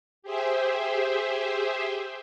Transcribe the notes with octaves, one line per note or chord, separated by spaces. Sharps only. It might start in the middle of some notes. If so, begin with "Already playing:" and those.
G4 G#4 C5 E5